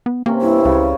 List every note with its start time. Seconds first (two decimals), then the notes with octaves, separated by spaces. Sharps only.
0.06 B3
0.26 C3 A#3 C#4
0.41 G2 E4
0.65 C#2 C#3